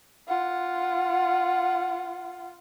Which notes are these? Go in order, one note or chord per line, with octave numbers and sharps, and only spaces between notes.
F4 F#5